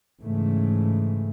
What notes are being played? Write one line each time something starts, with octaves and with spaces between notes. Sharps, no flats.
G#2 C#3 E3 A3